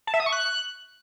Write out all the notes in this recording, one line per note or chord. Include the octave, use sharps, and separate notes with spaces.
A5
E5
D#6
C#6
F#6